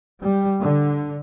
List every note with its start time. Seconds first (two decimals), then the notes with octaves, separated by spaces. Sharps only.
0.23 G3
0.62 D3